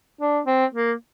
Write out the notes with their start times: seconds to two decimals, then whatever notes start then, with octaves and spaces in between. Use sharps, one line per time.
0.21 D4
0.47 C4
0.74 A#3